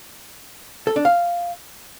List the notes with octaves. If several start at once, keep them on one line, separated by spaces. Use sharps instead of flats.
A4
D4
F5